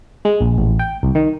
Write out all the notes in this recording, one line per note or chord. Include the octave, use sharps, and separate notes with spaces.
G#3
A#1
A1
G5
C2
D#3